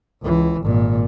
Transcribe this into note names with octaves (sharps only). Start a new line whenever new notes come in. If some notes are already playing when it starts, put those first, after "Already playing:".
C#2 E3
G#1 A#2